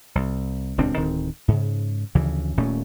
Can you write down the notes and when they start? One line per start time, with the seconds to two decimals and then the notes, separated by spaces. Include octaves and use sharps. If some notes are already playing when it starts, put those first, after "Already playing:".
0.15 C2
0.78 D#1 C#2 C4 D4
0.96 D1 D#3 C4
1.48 G#2 C#3
2.15 D2 C#3 E3 F3
2.57 D#1 A#2 A3 C#4